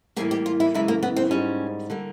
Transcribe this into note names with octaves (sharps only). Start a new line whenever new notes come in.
A2 E3 G3 A#3 G#4
G4
F4
E4
F#2 C#3 E3 G#3 E4
A#3
B3
C4
G#2 D#3 G3 C#4
D3 G3 A#3